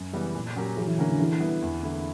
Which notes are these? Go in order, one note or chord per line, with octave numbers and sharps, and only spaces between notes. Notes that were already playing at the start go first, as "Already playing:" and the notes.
Already playing: F#2
C#3 E3 G3 B3
A#2
F#3 C#4 G4 A#4
E3 F#3
E3
D3 A#3 C#4 F#4 A#4
D3
D3 E3
G3 B3 E4
E2
D3 A#3 E4